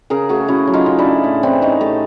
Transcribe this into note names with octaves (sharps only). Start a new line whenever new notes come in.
C#3 G#4 A#4
A3 F#4 G#4
C#3 E4 F#4
F#3
D#4 F4
C#3
D4 E4
C#3
A2
E3 C4 D4
A2 C#4 D#4
A2 G4 A4